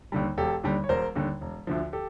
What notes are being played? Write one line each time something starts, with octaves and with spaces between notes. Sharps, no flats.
D#2 D3 G3
E1 G4 A4
D#2 D3 G3
C#5
E1 A#4 C5
D#2 D3 G3
E1
D2 D3 F3
G4 A4